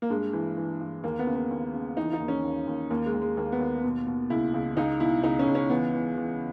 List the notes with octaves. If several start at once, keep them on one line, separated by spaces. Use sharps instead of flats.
A#3
G2 G#3
E3
E3
G2
D#2 A#3
B3
C#3
B3
D#2
C#3
E3 D#4
D#4
D#2
C#4
D#2
D#2
D#2 A#3
G#3
D#2
G#3
D#2 A#3
B3
D#2
B2
B2
C#2 E4
C#2
C#2 D#4
B2 E4
C#2 D#4
C#4
C#2
C#4
E3 B3
E3
E3